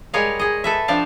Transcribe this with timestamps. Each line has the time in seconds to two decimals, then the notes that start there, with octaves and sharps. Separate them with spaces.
0.14 G3 G#3 A#4 C#5 D#5 F5
0.39 G#4 D#5
0.64 A4 B4 E5
0.88 F3 C4 D4 D5 F5 A5